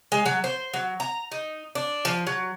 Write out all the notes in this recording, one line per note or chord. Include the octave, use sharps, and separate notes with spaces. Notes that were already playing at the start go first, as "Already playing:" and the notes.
G#3
F#3
C5
F#3
A#5
D#4
D4
F3
F#3